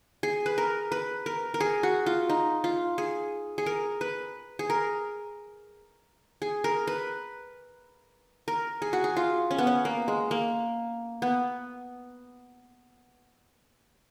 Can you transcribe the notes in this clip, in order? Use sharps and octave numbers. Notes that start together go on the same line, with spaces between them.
G#4
B4
A#4
B4
A#4
A#4
G#4
F#4
F4
D#4
F4
G#4
G#4
A#4
B4
G#4
A#4
G#4
A#4
B4
A#4
G#4
F#4
G#4
F4
C#4
B3
C#4
A#3
G#3
A#3
B3